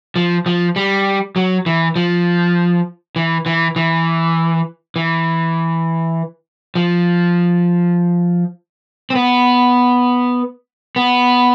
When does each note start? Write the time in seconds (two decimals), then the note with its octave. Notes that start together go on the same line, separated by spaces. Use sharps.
0.16 F3
0.46 F3
0.76 G3
1.36 F#3
1.66 E3
1.96 F3
3.16 E3
3.46 E3
3.76 E3
4.96 E3
6.75 F3
9.10 C4
9.15 B3
10.96 B3